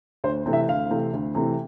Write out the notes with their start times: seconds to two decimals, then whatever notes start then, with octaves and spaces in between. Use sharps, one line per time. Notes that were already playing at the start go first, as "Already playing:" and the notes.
0.24 D2 C5
0.46 C3 E3 A3 C4
0.53 E5
0.68 D2 F5
0.90 C3 E3 A3 C4
1.13 D2
1.35 C3 E3 A3 C4